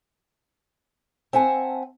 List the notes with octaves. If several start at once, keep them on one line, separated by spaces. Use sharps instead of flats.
C4 E5 F#5 G#5 A5